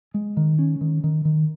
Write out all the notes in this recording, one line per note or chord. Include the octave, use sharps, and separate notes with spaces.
G#3
D#3
C#4
D#3
D#3
D#3